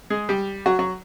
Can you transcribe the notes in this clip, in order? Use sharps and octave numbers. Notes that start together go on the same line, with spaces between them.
G#3 G#4
G3 G4
F#3 F#4
F#3 F#4